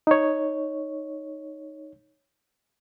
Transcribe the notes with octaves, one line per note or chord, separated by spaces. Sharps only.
D#4 C#5